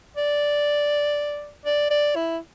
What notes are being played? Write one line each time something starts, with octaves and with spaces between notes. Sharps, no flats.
D5
D5
D5
E4